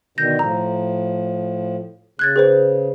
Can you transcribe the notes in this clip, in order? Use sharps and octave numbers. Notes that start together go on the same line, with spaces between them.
B2 D3 D#3 G6 A#6
A2 F3 A#5
C#3 F#6 G#6 A6
G#4 B4 C5